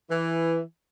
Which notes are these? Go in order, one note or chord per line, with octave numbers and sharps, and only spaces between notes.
E3